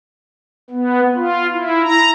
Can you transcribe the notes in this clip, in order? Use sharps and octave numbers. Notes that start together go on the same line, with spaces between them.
B3
F4
E4
A#5